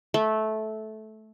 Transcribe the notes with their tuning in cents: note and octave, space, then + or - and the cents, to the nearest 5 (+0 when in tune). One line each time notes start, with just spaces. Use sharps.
A3 -15